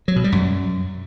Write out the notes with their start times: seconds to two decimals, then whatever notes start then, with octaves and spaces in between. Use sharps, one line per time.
0.08 F#3
0.16 B2
0.24 G3
0.32 F#2